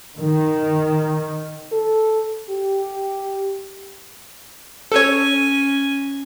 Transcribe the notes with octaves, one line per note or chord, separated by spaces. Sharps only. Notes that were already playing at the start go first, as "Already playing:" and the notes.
D#3
A4
G4
C#4 A4 C#5 G#5